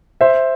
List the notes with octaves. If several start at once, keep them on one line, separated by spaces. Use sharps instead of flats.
C5 E5